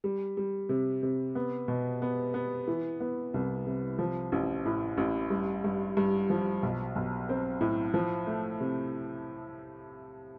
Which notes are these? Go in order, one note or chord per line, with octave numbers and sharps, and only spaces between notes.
G3
G3
C3
C3
B3
B2
B3
B3
E3
B3
C2
C3
F3
A1
A2
A1
G2
G2
G2
F3
B1
B1
C4
A2
F3
A3
C3